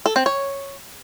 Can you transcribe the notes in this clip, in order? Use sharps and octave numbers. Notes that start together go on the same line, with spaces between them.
A4
C4
C#5